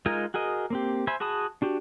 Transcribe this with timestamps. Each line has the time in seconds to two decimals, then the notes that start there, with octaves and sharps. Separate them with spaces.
0.06 G#3 D#4 F4 A#4 G#5
0.34 F#4 G#4 A#4 D#5
0.70 A#3 C4 G4
1.07 C5 E5 G#5 B5
1.20 F#4 G#4 A5 B5 D#6
1.62 D4 F#4 G4